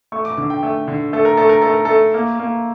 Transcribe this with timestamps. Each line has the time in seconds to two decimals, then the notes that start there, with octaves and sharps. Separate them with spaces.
0.12 A3 C#6
0.25 D6
0.37 D3 D6
0.50 G5
0.63 A3
0.88 D3
1.13 A3 A4
1.25 A#4
1.37 A3 A4
1.49 A#4
1.61 A3 A4
1.74 A#4
1.85 A3 A4
2.14 A#3
2.39 A#3